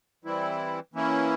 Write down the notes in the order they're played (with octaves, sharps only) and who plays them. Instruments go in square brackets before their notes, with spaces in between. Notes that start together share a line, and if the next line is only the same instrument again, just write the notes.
[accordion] E3 G3 C4 E4
E3 A#3 C#4 E4